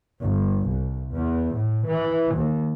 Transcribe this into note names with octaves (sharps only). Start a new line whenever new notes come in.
G1
C2
E2
A2
E3
D#2